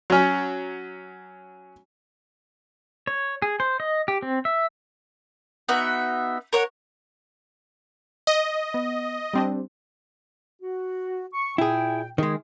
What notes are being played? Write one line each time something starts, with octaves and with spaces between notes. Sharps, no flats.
F#3 C#4
C#5
G#4
C5
D#5
G4
C4
E5
B3 D#4 F#4 E5
A#4 C#5 F#5
D#5
B3
G3 C4 D4
F#4
C#6
A#2 E4 G#4 G5
D#3 G#3 G#4